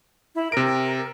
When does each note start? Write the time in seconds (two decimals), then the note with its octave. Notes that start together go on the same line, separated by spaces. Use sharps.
0.35 E4
0.52 C3 A#4 D7